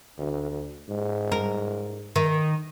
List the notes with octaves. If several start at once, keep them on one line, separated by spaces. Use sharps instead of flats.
D2
G#2
A#4
D#3